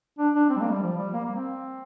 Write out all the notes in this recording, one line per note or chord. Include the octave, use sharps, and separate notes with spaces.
D4
D4
C4
G3
A#3
G3
F3
G3
A#3
A#3
C4